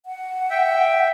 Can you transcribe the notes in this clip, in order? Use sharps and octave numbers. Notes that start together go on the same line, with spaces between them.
F#5
E5 G5